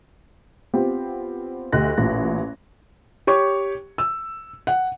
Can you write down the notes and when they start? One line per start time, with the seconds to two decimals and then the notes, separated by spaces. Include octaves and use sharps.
0.74 B3 C4 F4 G4
1.72 D2 G4 D#5 F#6 A#6
1.98 A1 A#2 A#6
3.27 G4 C#5 C#6
3.98 E6
4.67 F#5